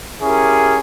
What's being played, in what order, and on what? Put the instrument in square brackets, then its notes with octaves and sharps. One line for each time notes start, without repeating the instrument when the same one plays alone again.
[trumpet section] C#4 E4 G4 G#4 A#4